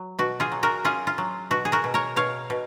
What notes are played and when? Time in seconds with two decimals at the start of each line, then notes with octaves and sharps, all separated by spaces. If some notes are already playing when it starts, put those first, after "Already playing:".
Already playing: F#3
0.19 B2 F#4
0.40 F4 G#4
0.52 F#3
0.63 F#4 A#4
0.84 C#4 F4 G#4
1.07 F4
1.18 F#3
1.51 B2 F#4
1.65 G#4
1.72 F#4 A#4
1.84 B2
1.94 A#4 C#5
2.16 B2 C#5 F5
2.50 B2